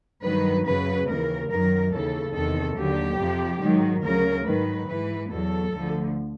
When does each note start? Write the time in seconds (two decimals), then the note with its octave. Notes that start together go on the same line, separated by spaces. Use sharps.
0.23 G2 D#3 F#3 B4
0.66 F#2 C#3 F#3 B4
1.08 D#2 C#3 E3 A#4
1.50 F#2 D#3 F#3 A#4
1.92 D#2 C#3 E3 A4
2.34 E2 C3 D#3 A4
2.77 D#2 D3 F#3 G4
3.19 F2 C3 F3
3.61 G#2 D#3 F#3
4.03 D2 C#3 F#3 A#4
4.46 G#2 D#3 F#3 B4
4.87 G#2 E3 B4
5.30 E2 B2 F#3 A4
5.72 D2 D3 F3